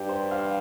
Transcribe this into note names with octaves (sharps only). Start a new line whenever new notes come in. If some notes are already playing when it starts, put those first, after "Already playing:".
Already playing: G2 G4
C5
F5